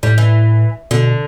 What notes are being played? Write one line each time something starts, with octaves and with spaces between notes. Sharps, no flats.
A2 G3
E3
B2 D3